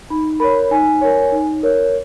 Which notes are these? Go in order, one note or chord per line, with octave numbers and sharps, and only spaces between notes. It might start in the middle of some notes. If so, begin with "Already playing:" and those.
D#4 B5
A#4 C#5 B5
D#4 G#5
A#4 C#5
D#4
A#4 C#5